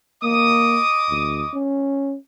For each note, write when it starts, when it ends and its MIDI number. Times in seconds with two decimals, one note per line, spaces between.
0.24 0.80 58
0.24 1.58 75
0.24 1.58 86
0.24 1.58 87
1.09 1.43 38
1.53 2.15 61